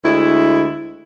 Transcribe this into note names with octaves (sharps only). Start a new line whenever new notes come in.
D2 G#3 E4